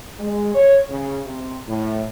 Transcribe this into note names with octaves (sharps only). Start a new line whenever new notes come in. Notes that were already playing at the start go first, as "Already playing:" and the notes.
G#3
C#5
C#3
C3
A2